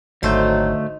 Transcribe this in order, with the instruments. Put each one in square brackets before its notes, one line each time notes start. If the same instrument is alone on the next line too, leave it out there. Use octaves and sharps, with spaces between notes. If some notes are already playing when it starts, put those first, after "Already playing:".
[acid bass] G#1 [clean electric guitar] D2 A3 [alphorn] F#3 [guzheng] D#4 C5